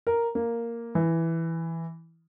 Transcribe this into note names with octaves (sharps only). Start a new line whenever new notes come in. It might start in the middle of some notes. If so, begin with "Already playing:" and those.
A#4
A#3
E3